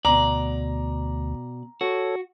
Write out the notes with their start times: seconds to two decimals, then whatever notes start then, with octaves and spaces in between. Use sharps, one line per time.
0.05 D2 B2 D5 A#5
1.81 F#4 A4 C#5